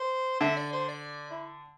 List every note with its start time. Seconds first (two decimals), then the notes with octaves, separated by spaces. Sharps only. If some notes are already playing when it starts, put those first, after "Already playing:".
Already playing: C5
0.40 D3 E5
0.57 D5
0.73 C5
0.89 D5
1.31 E4